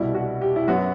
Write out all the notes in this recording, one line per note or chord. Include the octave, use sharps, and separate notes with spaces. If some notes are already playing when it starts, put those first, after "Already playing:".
Already playing: C2 B2 G3 E4
F#4
G4
E4
F#2 F#3 B3 F#4